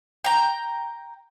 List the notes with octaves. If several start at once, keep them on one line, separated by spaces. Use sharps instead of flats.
G5 A#5